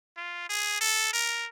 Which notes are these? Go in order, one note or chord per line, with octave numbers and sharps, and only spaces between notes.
F4
G#4
A4
A#4